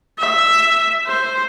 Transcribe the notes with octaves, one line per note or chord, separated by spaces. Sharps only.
E5
C5